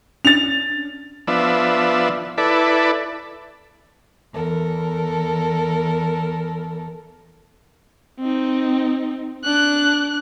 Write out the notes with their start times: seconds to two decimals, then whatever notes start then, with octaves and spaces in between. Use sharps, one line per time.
0.25 C#4 D4 A6 F7
1.27 F3 B3 D4 E5
2.38 E4 A4 B4 D5
4.33 E2 A4 A#4
8.20 C4 D#4
9.44 D4 F#6